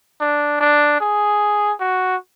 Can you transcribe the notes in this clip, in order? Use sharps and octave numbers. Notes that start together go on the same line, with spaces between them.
D4
D4
G#4
F#4